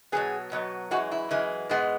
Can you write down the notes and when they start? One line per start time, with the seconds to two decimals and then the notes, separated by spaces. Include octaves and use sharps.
0.12 B2 F#3 B3 G#4
0.52 B2 F#3 B3
0.91 F#2 E3 G#3 F#4
1.11 E4
1.31 F#2 E3 G#3
1.69 G#2 G#3 B3